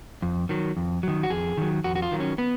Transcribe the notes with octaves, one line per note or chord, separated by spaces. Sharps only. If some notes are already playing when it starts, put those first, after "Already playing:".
F2
D#3 F#3
F2
D#3 F#3
F#4
F2 G#4
D#3 F#3
F2 F#4
F#4
F4
D#3 F#3
C#4
B3